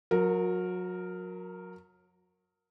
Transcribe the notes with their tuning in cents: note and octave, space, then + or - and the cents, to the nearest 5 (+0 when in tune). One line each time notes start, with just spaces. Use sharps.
F#3 -30 A#4 +0